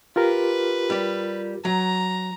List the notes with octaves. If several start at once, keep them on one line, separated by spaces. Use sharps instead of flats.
F4 G4 A#4 B4
G3 D5
F#3 A#5